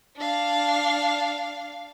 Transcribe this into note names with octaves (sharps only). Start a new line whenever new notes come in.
D4 F5